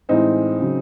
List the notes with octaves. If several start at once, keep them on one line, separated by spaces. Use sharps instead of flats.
A2 E3 G#3 C4 D#4
C#3 F#3